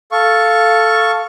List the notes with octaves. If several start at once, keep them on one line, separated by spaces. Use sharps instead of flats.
A4 F5 C#6